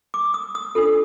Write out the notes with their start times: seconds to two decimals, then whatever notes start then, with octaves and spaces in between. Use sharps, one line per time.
0.14 D6
0.34 D#6
0.55 D#6
0.75 D4 F4 A4